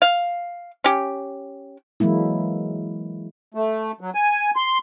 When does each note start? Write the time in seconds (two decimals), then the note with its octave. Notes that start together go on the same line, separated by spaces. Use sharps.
0.02 F5
0.84 C#4 G4
2.00 E3 F#3 G#3 A#3 E4
3.54 A3
4.01 F#3
4.14 G#5
4.56 C6